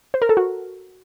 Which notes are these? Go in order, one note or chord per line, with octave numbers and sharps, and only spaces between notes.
C5
A#4
A4
F#4